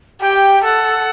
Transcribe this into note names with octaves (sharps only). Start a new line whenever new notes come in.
G4 G5
A4 F#5